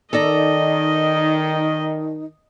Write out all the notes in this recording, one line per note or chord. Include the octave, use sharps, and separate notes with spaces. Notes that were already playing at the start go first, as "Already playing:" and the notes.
D#3 D#4 A4 D5 D#5 A#5